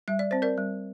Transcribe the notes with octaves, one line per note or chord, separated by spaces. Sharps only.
G3 E5
D5
C4 C5
A#4 D5
G3